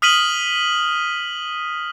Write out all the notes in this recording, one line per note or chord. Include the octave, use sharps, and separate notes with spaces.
D#6 F6 B6 D#7 F#7 G7